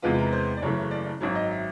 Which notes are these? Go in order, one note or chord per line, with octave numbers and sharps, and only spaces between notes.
E2 C3 E3 G#3 B3 F4
A#4
C5
D5
F#1 F#2 C#3 E3 A3 C#5
D5
D5
G#1 F#2 D#3 F#3 C#5
D#5
E5